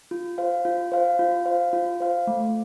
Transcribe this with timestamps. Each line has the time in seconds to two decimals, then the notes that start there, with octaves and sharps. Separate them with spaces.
0.11 F4
0.38 C5 F5
0.65 F4
0.92 C5 F5
1.19 F4
1.46 C5 F5
1.73 F4
2.00 C5 F5
2.27 A3